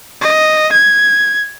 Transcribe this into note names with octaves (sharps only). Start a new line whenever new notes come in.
D#5
G#6